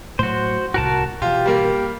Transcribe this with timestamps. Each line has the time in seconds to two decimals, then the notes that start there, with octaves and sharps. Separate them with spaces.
0.19 A2 F#3 F#4 C5
0.74 C2 A2 F#4 A#4 A5
1.22 B2 E3 F4 G4
1.46 G3 A#3 A#4